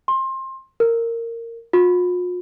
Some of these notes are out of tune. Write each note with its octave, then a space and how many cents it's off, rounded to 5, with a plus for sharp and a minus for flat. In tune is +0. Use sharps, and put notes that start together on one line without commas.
C6 +25
A#4 -15
F4 +45